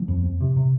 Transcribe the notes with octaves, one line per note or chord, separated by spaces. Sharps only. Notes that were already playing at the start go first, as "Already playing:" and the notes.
Already playing: F3
F2
F2
C3
C3